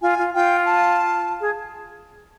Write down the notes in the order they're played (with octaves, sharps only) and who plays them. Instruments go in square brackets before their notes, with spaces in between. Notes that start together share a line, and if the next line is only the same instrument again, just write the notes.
[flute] F4 [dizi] G#5
[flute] F4
[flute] F4 [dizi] G5
[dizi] A5
[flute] G#4